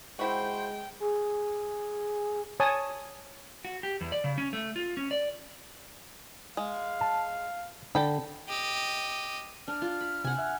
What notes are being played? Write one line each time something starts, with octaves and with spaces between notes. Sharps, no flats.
G#3 C4 E4 F#4 C5 G5
G#4
C#5 G#5 A5 D#6
F#4
G4
E2
D5
C#3
C#4
A3
F4
C#4
D5
G#3 F5
A5
D3 A4 G5 B5
G4 D#5
D4 F6
F4
B5
C3 F#5 G#5
E5